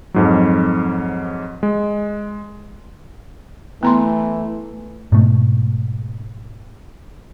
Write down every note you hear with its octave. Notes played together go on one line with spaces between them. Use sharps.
F2 G#2 F#3
G#3
E3 A3 B3 A#5 C6
G#2 B2 A3